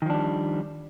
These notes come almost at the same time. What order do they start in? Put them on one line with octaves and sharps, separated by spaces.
D#3 F3 D4 G3